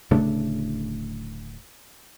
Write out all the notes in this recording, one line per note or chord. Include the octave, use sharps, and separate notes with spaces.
D1 C#3 A3 D4